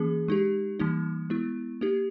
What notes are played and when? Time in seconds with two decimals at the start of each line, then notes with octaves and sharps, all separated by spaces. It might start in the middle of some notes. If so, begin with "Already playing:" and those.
Already playing: E3 A#3 C#4 G#4
0.28 G#3 D#4 G4
0.79 E3 G3 A#3 D#4
1.30 G#3 B3 E4
1.81 A#3 D#4 G4